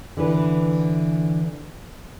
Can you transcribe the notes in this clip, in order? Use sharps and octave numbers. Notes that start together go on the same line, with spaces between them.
D3 E3 B4